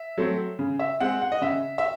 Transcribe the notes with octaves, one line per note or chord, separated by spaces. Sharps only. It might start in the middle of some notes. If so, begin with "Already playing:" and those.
Already playing: E5
F#3 A3 C4
C#3
E5
G#3 C4 F#5
F#5
D#5
C#3 E5
E5